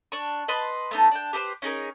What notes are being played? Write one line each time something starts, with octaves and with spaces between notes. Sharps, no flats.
D4 C#6
B4 D#5 A5 C6
A3 B3 D#4 A5
D4 G5
G4 A4 B4 C5
C#4 D#4 G#4 A#4